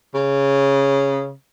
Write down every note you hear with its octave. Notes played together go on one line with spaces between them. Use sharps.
C#3